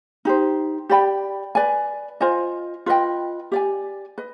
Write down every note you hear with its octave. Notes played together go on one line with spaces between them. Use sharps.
D#4 G4 C5
G4 D5 G5 B5
B4 D5 G#5
F4 C5 D#5 G#5
F4 B4 D#5 G5
G4 D5 G#5
B4 D#5